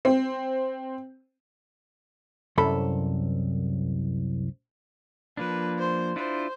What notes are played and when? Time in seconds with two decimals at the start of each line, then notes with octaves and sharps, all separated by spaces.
0.05 C4
2.58 C2 F#2 A4 B5
5.37 F3 A#3 D4 B4
5.78 C5
6.16 D4 E4 F4 C5